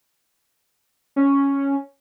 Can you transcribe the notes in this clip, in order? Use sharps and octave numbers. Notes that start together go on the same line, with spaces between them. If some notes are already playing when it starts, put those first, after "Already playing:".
C#4